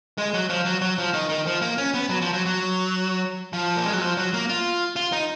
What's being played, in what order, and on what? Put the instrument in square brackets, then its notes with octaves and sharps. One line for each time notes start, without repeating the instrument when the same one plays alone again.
[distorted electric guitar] G#3
F#3
F3
F#3
F#3
F3
D#3
D#3
F3
A#3
C#4
B3
F#3
F3
F#3
F#3
F3
A#3
G#3
F#3
F3
F#3
A#3
F4
F4
D#4